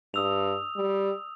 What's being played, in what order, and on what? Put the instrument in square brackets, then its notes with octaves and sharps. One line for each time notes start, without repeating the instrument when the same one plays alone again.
[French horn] G2 [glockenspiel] D#6 E6 F7
[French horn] G3